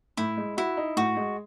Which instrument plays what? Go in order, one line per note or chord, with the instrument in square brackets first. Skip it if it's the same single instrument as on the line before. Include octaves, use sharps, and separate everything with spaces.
[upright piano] A2 [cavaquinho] E4
[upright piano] G#3
[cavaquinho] E4 [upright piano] F#4
[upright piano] D#4
[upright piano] A2 [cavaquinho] F#4
[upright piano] G#3